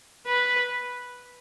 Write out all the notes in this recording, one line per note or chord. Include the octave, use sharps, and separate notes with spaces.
B4